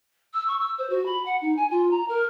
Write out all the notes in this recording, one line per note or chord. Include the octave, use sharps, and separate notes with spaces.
E6
C#6
E6
C5
F#4
B5
F#5
D#4
G#5
F4
A#5
A#4